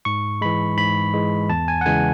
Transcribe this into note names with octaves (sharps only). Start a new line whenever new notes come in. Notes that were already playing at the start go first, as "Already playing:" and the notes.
G#2 C#6
E3 G#3 B5
G#2 B5
E3 G#3
E2 A5
G#5
F#5
C#3 E3 G#3 G#5